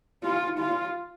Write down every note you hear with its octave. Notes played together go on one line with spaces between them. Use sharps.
F4
F4